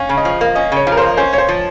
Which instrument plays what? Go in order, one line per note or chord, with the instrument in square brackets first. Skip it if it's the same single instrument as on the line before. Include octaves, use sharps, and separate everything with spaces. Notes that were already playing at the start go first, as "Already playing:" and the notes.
Already playing: [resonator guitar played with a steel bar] C#4 [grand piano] F5
[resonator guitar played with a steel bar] C#3
[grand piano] D#5
[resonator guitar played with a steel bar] F3 [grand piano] F5
[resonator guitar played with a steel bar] A#3
[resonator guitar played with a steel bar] C#4 [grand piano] D#5
[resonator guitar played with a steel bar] C#3 [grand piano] C#5
[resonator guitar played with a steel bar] F3
[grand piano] A#4
[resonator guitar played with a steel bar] A#3 [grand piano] C5
[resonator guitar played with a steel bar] C#4 [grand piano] C5
[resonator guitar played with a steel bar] A#2 [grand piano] C#5
[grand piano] C5
[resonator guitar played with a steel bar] F3